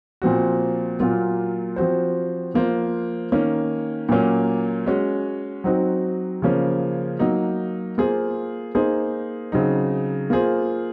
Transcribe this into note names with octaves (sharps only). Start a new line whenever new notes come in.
A#2 F3 C4 F#4
A#2 F#3 A#3 F4
F3 C4 F#4 C5
F3 A#3 F4 C5
D#3 A#3 C#4
A#2 F#3 A#3 C#4
G#3 C#4 F#4
F#3 C4 D#4 F#4
C#3 F3 A#3 C#4
F#3 A#3 D#4 F#4
A#3 F4 G#4 C5
A#3 D#4 G#4 C5
C#3 F#3 C4 D#4
A#3 F4 G#4 C5